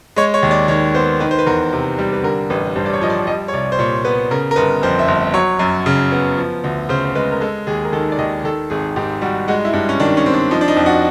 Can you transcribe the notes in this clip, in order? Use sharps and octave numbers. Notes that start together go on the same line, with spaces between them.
G#3 C#5
C#5
D#2
D5
D#3 C#5
B3 C5
D#3 B4
C5
B4
E2 A#4
C3
G3
B4
D3 A#4
A1 B4
G2 C5
D5
C#5
F3 D#5
D5
G3 D#5
C#5
C2 D5
C5
A#2 C#5
B3 B4
C#3 A#4
A#4
G1 B4
F2 C5
E5
G1
F#3 C#5
F#2
C#3
B3
F3
D2
C#3 C5
C5
G#3 B4
A#4
G#3 A4
D#2 G#4
A#4
D#3 A4
D5
D#2 D#5
D#3 A4
G#1 G#4
G#2 G4
G3 F#4
G#3 F#4
E4
G2
C#4
D#3 D4
C#4
C4
D4
F3 D#4
D4
D#4
F2
F#4